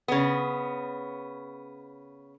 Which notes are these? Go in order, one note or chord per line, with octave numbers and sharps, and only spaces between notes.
C#3 B3